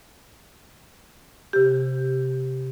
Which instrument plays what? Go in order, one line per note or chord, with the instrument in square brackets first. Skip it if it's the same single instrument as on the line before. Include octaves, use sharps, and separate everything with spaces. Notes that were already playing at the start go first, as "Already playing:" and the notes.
[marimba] C3 G4